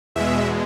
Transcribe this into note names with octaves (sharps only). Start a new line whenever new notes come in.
E2 B2 G#3 E5